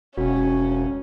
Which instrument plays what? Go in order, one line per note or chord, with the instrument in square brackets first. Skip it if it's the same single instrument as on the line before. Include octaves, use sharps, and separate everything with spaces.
[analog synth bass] E1 [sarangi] C#4 [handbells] F#4